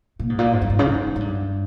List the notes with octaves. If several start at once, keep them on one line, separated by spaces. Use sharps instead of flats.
A#2
G#2
A#2
G#2
G2
G#2
C#3
G#2
G#2
G2